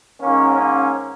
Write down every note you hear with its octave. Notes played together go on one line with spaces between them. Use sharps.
G#2 D#3 A#3 C#4
C#4